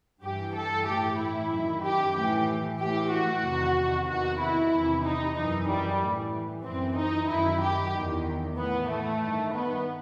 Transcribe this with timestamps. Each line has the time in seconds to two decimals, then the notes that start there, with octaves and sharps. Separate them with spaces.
0.21 G2 E3 G4
0.55 A4
0.86 A2 E3 G4
1.18 E4
1.50 F#2 D#3
1.82 G4
2.14 A2 E3 G4
2.79 A2 E3 G4
3.11 F#4
3.43 E2 C3 D#3
4.07 E2 C3 D#3 F#4
4.39 E4
4.72 E2 C3 E3
5.04 D#4
5.35 F#2 E3 D#4
5.68 G3
6.00 A2 E3
6.64 F#2 E3 C4
6.96 D#4
7.28 F#2 D#3 E4
7.61 G4
7.93 E2 D#3
8.56 A2 E3 B3
8.89 A3
9.21 G2 D#3
9.53 B3